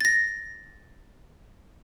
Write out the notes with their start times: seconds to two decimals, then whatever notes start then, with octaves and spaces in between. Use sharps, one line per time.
0.01 A6 A#6